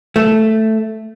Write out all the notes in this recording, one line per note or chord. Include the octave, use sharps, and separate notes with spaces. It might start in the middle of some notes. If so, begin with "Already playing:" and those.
A3